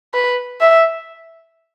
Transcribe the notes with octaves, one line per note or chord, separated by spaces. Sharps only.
B4
E5